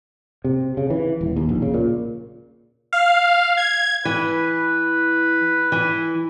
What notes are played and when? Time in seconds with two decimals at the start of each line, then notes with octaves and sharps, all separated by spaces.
0.44 C3
0.77 C#3
0.90 E3
1.21 D#1
1.36 D#2
1.49 A#1
1.62 C#3
1.74 A#2
2.93 F5
3.57 G#6
4.05 E3 B4
5.72 E3